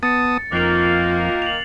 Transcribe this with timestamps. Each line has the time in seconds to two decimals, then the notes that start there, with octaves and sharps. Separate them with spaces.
0.03 B3 A5 D#6 A6 C#7
0.52 F2 D#3 A#3 F4 F#6 C7 F7
1.42 F7 F#7